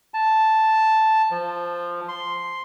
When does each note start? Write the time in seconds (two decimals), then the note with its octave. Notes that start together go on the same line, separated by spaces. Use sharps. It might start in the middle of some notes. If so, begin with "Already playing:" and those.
0.14 A5
1.31 F3
2.08 C6